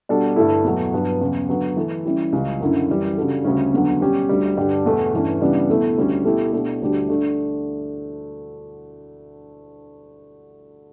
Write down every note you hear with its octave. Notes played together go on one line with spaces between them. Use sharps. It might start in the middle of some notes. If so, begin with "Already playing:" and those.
B2 G3 D4 F#4 A4
G2 D3 A3 E4
E2 B2 F#3 A3
G2 F#3 B3
E2 C#3 F#3
D3 F#3 B3
E3 A3 E4 A4
E3 G3 C#4 E4 G4
C#2 C#3 G3
F#2 D3 F#3 C#4 E4
F#2 E3 G3
C#3 G3 D4 F#4 A4
D2 C#3 G3 C#4
E2 D3 F#3
B2 G3 C#4 G4
D2 D3 G3
G2 D3 G3 D4 G4
E2 B2 A3
G2 E3 A3 C#4
C#3 E3 G3 B3 D4
E2 B2 A3 E4
D2 D3 G3 C#4
B2 A3 E4 G4
B2 A3 D4 G4
D2 D3 G3 D4 G4
D3 A3 D4